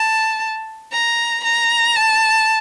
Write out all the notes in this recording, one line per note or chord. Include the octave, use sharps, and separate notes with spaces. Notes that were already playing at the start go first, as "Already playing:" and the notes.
Already playing: A5
A#5
A#5
A5